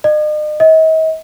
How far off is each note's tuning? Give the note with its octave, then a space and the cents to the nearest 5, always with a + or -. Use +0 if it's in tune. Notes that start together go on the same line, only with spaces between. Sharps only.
D#5 -45
D#5 +40